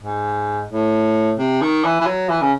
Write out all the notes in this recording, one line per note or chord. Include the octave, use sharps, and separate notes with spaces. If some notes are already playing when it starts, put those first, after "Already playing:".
G#2
A2
C3
D#3
E3
E3
F#3
E3
C#3